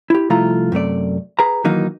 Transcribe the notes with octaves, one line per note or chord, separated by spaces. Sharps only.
E4 G4
C2 F3 A3 E4 F4 A#5
F#2 C3 A3 D5
G#4 B4 A#5
D#3 E3 F#3 A#3 D#4